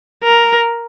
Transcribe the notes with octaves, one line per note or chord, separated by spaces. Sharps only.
A#4